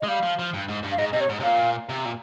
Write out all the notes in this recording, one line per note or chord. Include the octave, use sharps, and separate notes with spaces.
D#5
G#3
G3 F5
F3
F3
G2
G#2
G2
F5
G#2 D#5
C3 D#5
C#5
G#2
C3
A#2 F5
C3
A#2